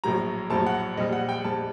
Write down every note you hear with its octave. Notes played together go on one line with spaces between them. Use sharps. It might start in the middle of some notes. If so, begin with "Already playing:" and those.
A#1 A2 F#3 A#5
A#1 A2 F#3 A5
F#5
A#1 A#2 G3 D#5
F#5
G5
A#1 A#2 G3 A5